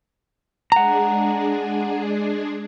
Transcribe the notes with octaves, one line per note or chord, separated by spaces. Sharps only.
G#3 D4 G#4 F#5 A#5